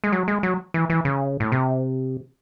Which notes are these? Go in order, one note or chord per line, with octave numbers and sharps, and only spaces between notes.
G#3
F#3
G#3
F#3
E3
E3
C#3
A2
C3